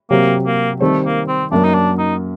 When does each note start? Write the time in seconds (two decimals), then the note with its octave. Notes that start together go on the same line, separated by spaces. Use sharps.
0.10 C3 F#3 A#3 C4 G4
0.46 A#3
0.81 D#3 G3 A3 C4
1.05 A#3
1.28 C4
1.52 F#2 F#3 A#3 D4
1.64 D#4
1.75 D4
1.98 D#4